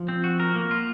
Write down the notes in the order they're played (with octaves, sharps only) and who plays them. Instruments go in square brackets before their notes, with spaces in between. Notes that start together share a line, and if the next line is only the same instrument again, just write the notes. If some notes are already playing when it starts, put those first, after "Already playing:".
Already playing: [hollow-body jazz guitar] F3
[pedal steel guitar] C4
F#4
A#4
A#3
F4